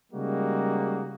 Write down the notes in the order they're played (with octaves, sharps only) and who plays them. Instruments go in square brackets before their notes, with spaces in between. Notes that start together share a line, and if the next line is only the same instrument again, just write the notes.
[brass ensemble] C#3 G3 G#3 A#3 D#4 F#4